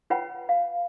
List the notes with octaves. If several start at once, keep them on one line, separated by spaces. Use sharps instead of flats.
F4 B4 C#5 F#5 G5 B5
F5